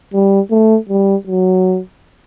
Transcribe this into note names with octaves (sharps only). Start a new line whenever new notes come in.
G3
A3
G3
F#3